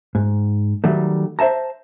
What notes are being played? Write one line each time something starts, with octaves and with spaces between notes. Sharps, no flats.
G#2
D#3 F#3 G3 A3
C5 E5 A5 A#5